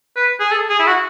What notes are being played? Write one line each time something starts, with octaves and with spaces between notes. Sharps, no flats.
B4
G#4
A4
G#4
E4
F#4